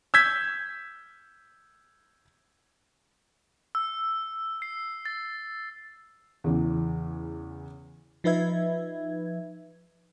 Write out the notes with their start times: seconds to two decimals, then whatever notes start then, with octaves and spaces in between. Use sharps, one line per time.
0.14 E6 G6 G#6 B6
3.75 E6
4.62 C7
5.06 A6
6.44 E2 C#3 E3
8.24 F3 D#4 B4 E5 G#6